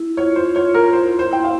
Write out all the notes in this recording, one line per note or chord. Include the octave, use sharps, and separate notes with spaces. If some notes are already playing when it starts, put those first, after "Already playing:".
Already playing: E4
F4 C#5
C5
F4 C#5
A#4
E4 C5
C5
E4 G5
F5